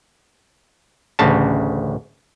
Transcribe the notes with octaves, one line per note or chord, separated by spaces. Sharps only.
A1 D2 C#3 A5